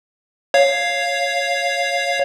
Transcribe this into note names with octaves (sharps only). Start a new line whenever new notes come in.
C#5 F5